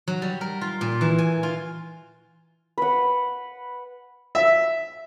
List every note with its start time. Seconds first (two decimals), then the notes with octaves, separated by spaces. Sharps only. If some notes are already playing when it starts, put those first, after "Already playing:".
0.08 F#3
0.22 G3
0.41 A#4
0.61 F4
0.81 A#2
1.01 E3
1.18 G#5
1.43 F4
2.78 B4 F#5
4.35 E5